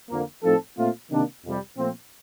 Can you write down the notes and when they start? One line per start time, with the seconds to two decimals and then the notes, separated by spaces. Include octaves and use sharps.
0.10 F2 D3 F3 A#3
0.44 A2 F3 C4 D#4 A4
0.77 A#2 A3 C4 F4
1.11 C3 D#3 A#3 D4
1.44 F2 C3 G3
1.77 A#2 F3 A3 C4